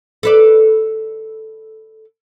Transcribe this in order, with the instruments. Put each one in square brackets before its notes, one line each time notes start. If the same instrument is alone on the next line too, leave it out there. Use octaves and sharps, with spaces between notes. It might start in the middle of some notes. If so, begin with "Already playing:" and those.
[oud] A4 B4 D5